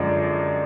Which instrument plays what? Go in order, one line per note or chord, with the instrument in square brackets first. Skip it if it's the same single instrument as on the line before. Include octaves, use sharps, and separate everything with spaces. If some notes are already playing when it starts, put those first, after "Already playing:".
Already playing: [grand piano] F#2 D3 F3 G#3 D5 D#5